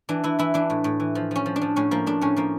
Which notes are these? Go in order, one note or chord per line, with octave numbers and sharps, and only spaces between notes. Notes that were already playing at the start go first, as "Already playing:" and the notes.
E3 D4
E3 E4
E3 E4
E3 D4
A2
A2
E3
F3
F3 C#4
F3
D4
F3
A2 C#4
F3 A#3
A2 D4
A2 C#4
F3 A#3